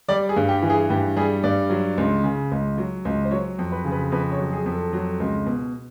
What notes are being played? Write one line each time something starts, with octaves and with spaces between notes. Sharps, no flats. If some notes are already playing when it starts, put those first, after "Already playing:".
G3 D5
G#4
G2
G4
E3
G#4
G2 G4
G3 G#4
G2 D5
F#3
C#2
C#3
C#2
F#3
C#2
C5
F#3 C#5
F2
B4
C#3
B4
F2 B4
C#5
F#3
G#4
F2
A4
F#3
C#2
B2